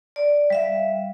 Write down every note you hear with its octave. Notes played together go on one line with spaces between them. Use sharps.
D5
G3 E5 F5